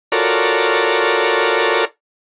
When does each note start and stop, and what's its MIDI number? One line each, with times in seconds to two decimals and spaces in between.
0.12 1.85 65
0.12 1.85 66
0.12 1.85 69
0.12 1.85 70
0.12 1.85 73
0.12 1.85 74